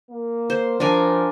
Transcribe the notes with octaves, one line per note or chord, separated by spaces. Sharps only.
A#3
C5
F3 D4 A#4 G#5